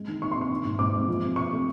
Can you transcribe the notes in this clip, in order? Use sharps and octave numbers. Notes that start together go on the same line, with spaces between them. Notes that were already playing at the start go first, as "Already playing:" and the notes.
Already playing: G#3
D#3
D#4 C#6
C6
C4
C#6
D#3
G#2
G#2 D6
G#3
F3
C3
C3 C#6
A3